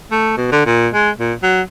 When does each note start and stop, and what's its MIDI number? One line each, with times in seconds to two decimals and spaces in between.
0.12 0.33 57
0.37 0.50 47
0.52 0.62 50
0.66 0.88 46
0.94 1.10 56
1.18 1.33 46
1.43 1.61 54